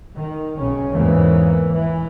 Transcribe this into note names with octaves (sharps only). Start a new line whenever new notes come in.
D#3
B1 C#3 C#4
E2 G#2 C#3 E3 A#3
E3